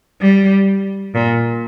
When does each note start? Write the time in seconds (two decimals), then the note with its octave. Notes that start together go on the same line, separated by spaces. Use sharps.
0.21 G3
1.15 A#2